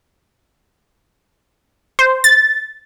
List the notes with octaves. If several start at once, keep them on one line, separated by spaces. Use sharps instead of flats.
C5
A6